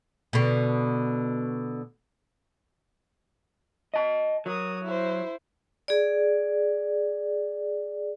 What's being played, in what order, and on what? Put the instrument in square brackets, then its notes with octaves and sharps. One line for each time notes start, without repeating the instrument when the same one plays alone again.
[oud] B2 D3
[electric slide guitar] D#5 A5
[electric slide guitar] F#3 [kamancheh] A#4 D#6
[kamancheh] E4 C5
[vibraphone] G#4 D5